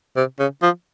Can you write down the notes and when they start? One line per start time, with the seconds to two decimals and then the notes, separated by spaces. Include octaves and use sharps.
0.17 C3
0.39 C#3
0.63 F3